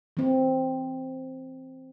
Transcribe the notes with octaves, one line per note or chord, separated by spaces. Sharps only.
E3 C4